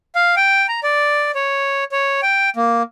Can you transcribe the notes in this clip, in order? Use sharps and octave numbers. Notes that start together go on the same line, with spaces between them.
F5
G5
A#5
D5
C#5
C#5
G5
A#3